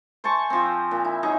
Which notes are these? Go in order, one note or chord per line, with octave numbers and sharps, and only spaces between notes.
C5 G#5 A5 C#6
F3 C4
A#2
E4
F#3 D#4 G#4 E5